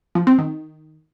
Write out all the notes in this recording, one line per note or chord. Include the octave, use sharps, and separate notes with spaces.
F3
C4
D#3